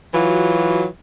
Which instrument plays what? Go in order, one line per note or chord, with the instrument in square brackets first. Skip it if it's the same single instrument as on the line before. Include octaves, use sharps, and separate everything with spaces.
[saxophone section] E3 F#3 F4 F#4